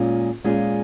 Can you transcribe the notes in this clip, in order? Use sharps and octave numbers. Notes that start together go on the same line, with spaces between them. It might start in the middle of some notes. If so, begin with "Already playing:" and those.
Already playing: A#2 G#3 C#4 F4
A#2 G#3 C#4 F4 G#4